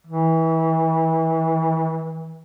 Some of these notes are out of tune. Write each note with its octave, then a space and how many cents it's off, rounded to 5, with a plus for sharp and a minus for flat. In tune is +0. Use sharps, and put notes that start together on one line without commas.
E3 -30